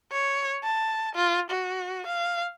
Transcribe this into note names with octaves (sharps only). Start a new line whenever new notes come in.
C#5
A5
F4
F#4
F5